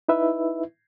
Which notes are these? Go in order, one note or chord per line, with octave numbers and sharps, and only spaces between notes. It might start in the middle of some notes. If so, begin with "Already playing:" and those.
D#4 E4 B4 E5